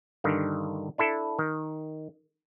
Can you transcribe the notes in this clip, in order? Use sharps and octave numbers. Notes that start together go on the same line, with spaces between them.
G2 D3 D#3
D4 E4 A4
D#3